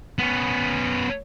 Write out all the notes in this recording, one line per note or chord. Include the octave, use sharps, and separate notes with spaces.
B3 C#4